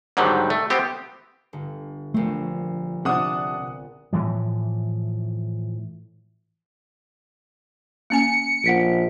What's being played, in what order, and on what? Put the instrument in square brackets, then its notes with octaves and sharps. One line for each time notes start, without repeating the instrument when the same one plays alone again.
[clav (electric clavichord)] G#2 D3 D#3 F#3 G3
A3
B3 C4 G4
[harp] G1
[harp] A#1 C4 [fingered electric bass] A3
[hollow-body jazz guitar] C3 D4 [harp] F4 [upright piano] F#5 D#6
[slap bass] A2 E3 F3
[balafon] A#3 C#4 G#5 [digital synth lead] C#7
[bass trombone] A#1 [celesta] F#5 B6 D7